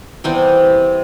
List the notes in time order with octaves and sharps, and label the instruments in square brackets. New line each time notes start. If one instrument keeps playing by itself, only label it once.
[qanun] C3 E3 G3 B3 C4